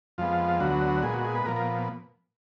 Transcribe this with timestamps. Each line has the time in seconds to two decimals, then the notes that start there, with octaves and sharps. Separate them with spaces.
0.18 F2 F3 G#3 B3 F4
0.60 D2 D3 F#3 B3 F#4
1.03 A#2 G#3 B3 G#4
1.14 F#4
1.25 G#4
1.35 B4
1.45 A#2 F3 B3 A#4
1.56 A#4